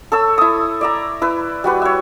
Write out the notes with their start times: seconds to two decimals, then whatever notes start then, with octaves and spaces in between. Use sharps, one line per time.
0.12 A4 C#5 E6
0.38 E4 D#6
0.81 D5 E5 A#5
1.22 E4 B4
1.64 G3 F#4 B4
1.82 C#5 E5